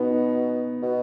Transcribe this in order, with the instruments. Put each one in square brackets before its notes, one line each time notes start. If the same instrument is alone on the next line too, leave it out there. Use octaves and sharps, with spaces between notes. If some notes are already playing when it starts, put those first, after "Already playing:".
Already playing: [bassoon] B2 [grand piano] B3 D#4
[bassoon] B2